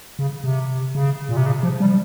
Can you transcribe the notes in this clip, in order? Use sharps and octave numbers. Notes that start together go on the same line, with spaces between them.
C#3
C3
C#3
A#2
C3
C#3
F3
G3